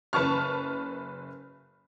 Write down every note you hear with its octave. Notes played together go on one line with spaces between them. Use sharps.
F#1 B4 A5 C#6 F6